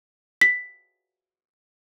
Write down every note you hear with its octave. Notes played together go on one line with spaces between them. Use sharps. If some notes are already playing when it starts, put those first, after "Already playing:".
B6